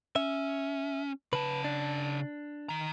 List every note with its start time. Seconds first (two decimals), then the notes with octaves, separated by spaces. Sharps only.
0.16 C#4 E5
1.33 C#3 B4 A5
1.65 D4
2.69 D#3 A#5